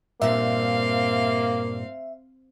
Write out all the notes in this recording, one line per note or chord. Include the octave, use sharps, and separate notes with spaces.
G2 A#2 A#3 C4 E5 F5